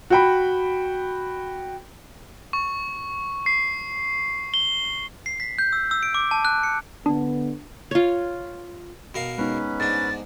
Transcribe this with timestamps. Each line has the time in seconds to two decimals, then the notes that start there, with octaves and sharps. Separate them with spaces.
0.10 F#4 G5 B5
2.53 C#6
3.46 C7
4.54 G7
5.26 C7
5.40 B6
5.58 G6
5.73 E6
5.91 E6
6.03 D7
6.14 D6
6.31 A5
6.45 F#6
6.63 C#7
7.06 D3 B3 D4
7.91 F4 C#5
9.15 B2 A#4 F5
9.38 G#3 B3 C#4 D#4 B4
9.80 G#2 D4 A6